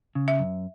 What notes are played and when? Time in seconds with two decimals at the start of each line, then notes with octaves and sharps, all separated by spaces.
0.15 C#3
0.28 E5
0.39 F#2